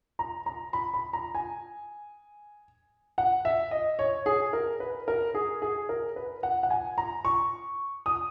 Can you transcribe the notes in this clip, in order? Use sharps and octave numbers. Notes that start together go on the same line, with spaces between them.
A#5
A#5
B5
B5
A#5
G#5
F#5
E5
D#5
C#5
G#4
A#4
B4
A#4
G#4
G#4
A#4
B4
F#5
F#5
G#5
A#5
C#6
D#6